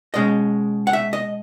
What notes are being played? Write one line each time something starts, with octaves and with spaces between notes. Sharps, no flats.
B2 G#3 C#4 D#5
F#5
E5
D#5